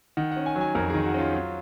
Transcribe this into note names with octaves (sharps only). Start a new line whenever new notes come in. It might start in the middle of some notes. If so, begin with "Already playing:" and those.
D#3 F#5
C#4 F#5
G#5
F#3
G#5
F2 A#4
D#3 G#4
F#4
C#4 F4
F#3